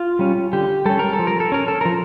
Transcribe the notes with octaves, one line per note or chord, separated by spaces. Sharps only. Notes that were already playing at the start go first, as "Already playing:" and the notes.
Already playing: F4
G3 C#4
D3 G4
G3 C#4 A4
A#4
A4
F3
A#4
A4
C#4 A#4
A4
F3 A#4